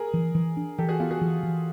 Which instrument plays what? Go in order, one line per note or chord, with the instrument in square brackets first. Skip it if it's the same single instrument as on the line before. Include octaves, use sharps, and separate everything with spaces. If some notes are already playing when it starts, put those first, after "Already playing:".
Already playing: [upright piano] G#4 A#4
[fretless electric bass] E3
E3
D4
[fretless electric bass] E3 [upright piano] G4 A4
[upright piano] F#4 G#4
[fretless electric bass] B3 [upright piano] F4 G4
[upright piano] F#4 G#4
[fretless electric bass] E3
E3